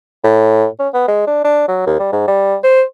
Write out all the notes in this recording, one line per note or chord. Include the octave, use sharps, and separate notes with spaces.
A2
C#4
B3
G#3
D4
D4
F#3
D#2
G3
G#2
G3
C5